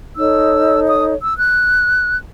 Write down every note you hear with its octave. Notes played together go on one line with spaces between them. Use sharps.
D#4 A4 C#5 E6
D#6
E6
F#6